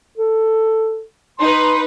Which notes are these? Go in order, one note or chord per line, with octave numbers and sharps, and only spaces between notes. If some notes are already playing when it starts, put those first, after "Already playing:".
A4
D#4 B4 C6